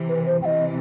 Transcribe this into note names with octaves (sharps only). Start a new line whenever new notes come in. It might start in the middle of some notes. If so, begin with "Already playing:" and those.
Already playing: C3 E3
B4
C5
C3 E3 D#5 G5